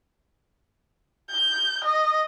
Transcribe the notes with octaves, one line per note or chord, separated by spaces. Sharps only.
G6
D#5